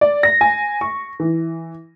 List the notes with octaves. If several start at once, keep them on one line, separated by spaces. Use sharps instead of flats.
D5
A#6
G#5
C#6
E3